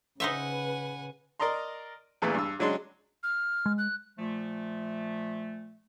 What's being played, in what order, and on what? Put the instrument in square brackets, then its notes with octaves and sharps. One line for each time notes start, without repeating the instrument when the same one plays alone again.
[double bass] C#3 [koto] D#4 C5 E5 [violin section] B4 [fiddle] F#5 G#5
[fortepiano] A#4 D5 D#5 A#5 C6
E2 A#2 C#3 E3 A3
G2 E6
C#3 F#3 G#3 D4 C6
[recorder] F6
[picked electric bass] G#3
[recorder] F#6
[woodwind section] A#2 F3 A3